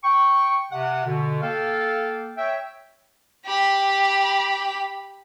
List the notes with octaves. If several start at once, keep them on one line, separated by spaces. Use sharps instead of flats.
G5 C#6
C3 F#5
B2 D3
A#3 A4 F5 G5
C#5 E5 G5
G4 B5